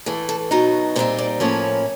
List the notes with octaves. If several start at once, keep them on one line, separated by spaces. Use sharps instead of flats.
A2 E3 A3 G#4
A4
B2 F#3 B3 D#4 A#4
A#2 G3 C4 D#4 C5
D5
A2 F3 A#3 C#4 E4 C#5